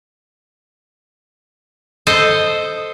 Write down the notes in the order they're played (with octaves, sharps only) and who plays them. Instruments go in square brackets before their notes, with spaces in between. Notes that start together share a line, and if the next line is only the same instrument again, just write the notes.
[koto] A4 C5 D#5